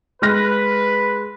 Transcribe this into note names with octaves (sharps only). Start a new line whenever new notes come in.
G#3 B4 F6 A#6